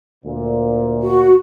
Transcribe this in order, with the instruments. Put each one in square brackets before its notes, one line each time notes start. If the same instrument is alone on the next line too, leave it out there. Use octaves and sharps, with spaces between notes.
[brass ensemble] D2 A#2
[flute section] F#4